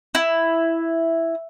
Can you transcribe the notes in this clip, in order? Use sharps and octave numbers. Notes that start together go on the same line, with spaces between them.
E4